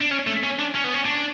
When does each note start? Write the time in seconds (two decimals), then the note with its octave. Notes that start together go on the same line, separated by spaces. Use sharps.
0.01 D4
0.11 C#4
0.27 A3
0.43 C#4
0.59 D4
0.75 C#4
0.84 B3
0.94 C#4
1.06 D4